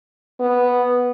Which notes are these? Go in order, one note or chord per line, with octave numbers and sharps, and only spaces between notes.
B3